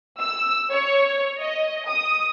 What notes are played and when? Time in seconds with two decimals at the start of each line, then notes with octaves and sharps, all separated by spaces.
0.20 E6
0.72 C#5
1.40 D#5
1.88 D#6